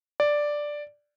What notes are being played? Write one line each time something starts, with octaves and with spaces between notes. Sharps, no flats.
D5